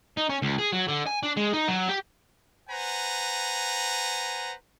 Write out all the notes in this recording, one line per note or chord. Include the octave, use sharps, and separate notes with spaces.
D#4
C#4
C#2
G#4
F#3
D3
G#5
D4
G#3
D#4
F#3
G4
B4 C5 F#5 G#5 A#5